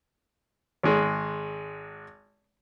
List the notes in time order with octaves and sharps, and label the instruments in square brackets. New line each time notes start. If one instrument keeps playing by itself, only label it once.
[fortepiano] G#1 G#3